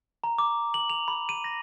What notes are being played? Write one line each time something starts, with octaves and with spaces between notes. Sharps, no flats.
A#5
D6
F#7
F7
B5
D#7
A#6